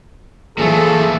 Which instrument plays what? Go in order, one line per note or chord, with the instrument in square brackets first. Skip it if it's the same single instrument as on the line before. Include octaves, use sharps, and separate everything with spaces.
[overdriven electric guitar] A#2 A3 [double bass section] E3 F3 [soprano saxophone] G#4 [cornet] A4